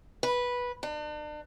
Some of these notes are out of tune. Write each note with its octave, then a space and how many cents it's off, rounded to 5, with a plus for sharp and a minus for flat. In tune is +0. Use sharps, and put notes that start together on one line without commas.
B4 -10
D4 +40